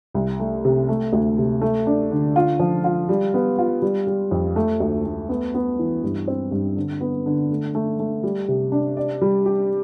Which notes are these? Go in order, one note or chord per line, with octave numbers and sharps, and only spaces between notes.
C2
A3
C3
A3
D2
C3
A3
D4
D3
F4
F3
F4
G3
B3
F4
G3
G3
F2
A3
D2
A3
B3
B3
E3
G2
C4
G2
D3
B3
D3
A3
A3
A3
G3
C3
D4
D5
G3
G4